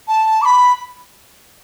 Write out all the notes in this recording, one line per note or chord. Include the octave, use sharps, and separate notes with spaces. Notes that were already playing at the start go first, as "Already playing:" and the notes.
A5
D6
B5